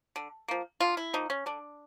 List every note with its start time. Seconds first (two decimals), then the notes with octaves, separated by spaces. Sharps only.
0.16 D3
0.48 F3 A#3
0.80 D3 F4
0.97 E4
1.13 F3 A#3 D#4
1.30 C#4
1.46 D3 D4